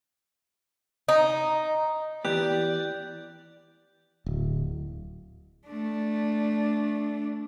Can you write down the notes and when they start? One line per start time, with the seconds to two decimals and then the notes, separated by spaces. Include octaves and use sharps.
1.08 D#4
2.25 E3 B3 G4 D5 F#6 G6
4.26 D1
5.68 A3 D4